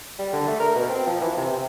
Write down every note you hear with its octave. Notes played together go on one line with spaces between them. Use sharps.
G3
D3
A3
A#4
B2
C4
F3
E3
C3
C3